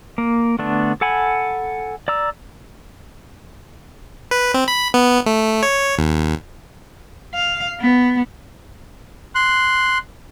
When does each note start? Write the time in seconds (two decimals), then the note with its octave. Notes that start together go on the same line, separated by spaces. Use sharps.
0.18 A#3
0.59 D3 A3 B3 D4
1.01 A4 F#5 G#5 B5
2.08 D5 A#5 E6
4.31 B4
4.54 C4
4.68 B5
4.94 B3
5.26 A3
5.63 C#5
5.98 D#2
7.34 F5
7.80 B3
9.35 C6 F#6